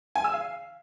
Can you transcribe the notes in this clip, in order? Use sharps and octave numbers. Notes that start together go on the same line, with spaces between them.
G#5
E6
F5